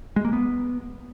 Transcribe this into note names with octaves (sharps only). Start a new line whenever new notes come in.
G#3
A#3
B3